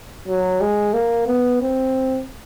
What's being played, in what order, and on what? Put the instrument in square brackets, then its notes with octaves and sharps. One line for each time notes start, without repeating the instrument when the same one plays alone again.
[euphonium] F#3
G#3
A#3
B3
C4